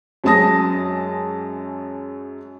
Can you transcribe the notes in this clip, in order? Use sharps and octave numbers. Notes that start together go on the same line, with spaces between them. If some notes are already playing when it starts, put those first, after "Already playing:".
F#2 F#3 G#3 A5 D#6 A#6